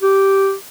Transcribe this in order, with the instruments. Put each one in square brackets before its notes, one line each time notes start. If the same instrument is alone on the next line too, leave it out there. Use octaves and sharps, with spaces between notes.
[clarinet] G4